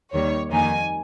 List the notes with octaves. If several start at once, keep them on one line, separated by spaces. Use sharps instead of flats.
D#2 D#3 G3 C#5
F2 D#3 A#3 D#4 G#5